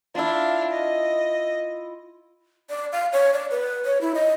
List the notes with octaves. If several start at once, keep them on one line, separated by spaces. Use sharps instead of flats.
D4 E4 F4 F5
D#5
D5
F5
C#5
D5
B4
C#5
E4
D#5